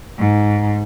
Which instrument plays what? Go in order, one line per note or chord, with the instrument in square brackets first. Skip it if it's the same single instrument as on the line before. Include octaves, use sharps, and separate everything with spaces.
[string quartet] G#2